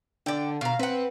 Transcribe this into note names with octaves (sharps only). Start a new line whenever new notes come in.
D3 D5 G5
B2 F5 A#5
C4 B4 F#5